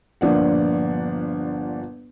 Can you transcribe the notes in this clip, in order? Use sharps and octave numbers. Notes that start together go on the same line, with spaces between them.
G1 A#2 F3 D4 F#5